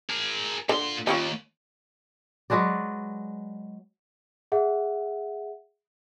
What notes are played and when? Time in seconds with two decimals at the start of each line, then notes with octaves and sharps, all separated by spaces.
0.09 G#4 A#4
0.69 A#2 D3 C6
1.07 D#2 G3 C#4 F4
2.50 F#3 G#3 B4 D5
4.52 G#4 E5 F#5